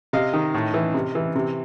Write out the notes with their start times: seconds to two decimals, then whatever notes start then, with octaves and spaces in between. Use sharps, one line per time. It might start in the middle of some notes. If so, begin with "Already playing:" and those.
0.13 C3 D#5 F5
0.33 D#3
0.54 A2
0.74 E3
0.94 C3
1.15 E3
1.35 C3